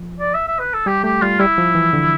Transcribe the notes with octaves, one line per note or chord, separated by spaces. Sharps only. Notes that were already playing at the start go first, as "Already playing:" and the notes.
Already playing: F3
D5
E5
E5
B4
A4
G3 G4
A3 G4
G3 F4
G3 E4
F3
E3
D3